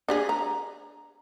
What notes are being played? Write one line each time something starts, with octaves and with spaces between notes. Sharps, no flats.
D4 G4 G#4
A#5